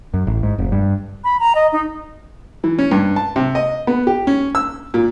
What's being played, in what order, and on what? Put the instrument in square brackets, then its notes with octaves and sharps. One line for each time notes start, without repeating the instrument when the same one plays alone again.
[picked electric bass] F#2
A1
G#2
F1
G2
[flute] B5
A#5
D#5
D#4
[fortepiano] E3
C#4
G2
A5
C3
D#5
B3
G4
C#4
E6
A#2